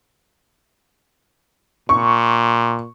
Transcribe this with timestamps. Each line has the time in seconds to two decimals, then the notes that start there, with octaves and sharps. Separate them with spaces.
1.89 A#2 C#6